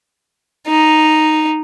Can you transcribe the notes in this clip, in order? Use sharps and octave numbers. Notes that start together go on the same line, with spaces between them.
D#4